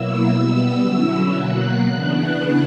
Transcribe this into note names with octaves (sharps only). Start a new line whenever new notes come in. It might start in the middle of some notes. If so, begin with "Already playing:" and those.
Already playing: B2 F#3 A#3 E4 E6
B2 G3 B3
D3 F#3 C#4 E4
B2 F#3 A#3 F#6
C#3 E3 B3 D4